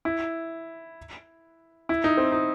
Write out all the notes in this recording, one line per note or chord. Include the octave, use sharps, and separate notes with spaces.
E4
E4
D#4
C4
D#4